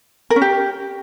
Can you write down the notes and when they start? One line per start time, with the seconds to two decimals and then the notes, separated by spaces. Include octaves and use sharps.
0.30 A#4
0.36 C#4
0.42 G4